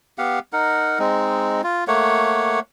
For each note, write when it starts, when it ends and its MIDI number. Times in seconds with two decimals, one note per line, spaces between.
0.18 0.39 59
0.18 0.39 67
0.18 0.39 77
0.18 0.39 78
0.53 0.99 63
0.53 0.99 70
0.53 0.99 78
0.99 1.61 56
0.99 1.61 60
0.99 1.61 63
1.64 1.84 65
1.88 2.60 57
1.88 2.60 58
1.88 2.60 73
1.88 2.60 78